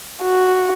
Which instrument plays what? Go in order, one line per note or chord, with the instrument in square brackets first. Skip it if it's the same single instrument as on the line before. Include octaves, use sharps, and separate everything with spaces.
[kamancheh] F#4